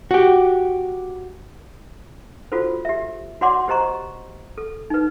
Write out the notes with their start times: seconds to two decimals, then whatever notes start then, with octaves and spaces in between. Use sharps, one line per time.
0.11 F#4 G4
2.52 F4 F#4 A4 C5
2.85 G4 E5
3.41 F#4 C#5 D5 F#5 C6 D6
3.68 G4 C5 D#5 A#5 C#6
4.58 A4
4.90 D#4 B4